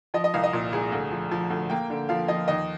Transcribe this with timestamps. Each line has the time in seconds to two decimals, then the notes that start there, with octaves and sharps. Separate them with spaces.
0.14 F3 D#5
0.24 D#5
0.34 C2 F5
0.44 D#5
0.53 A#2
0.73 C2 G#4
0.92 D2
1.11 F3
1.31 F3
1.50 D2
1.70 A#3 G5
1.90 D3
2.09 F3 F5
2.28 F3 D#5
2.48 D#2 D#5